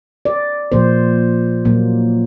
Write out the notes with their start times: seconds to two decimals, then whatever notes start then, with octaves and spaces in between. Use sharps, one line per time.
0.25 D5
0.72 A#2 F3 A#3 C5
1.65 A#2 F#3 A#3